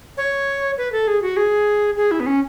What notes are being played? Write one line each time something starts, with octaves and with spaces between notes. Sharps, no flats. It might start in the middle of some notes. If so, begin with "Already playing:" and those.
C#5
B4
A4
G#4
F#4
G#4
G#4
E4
B3
C#4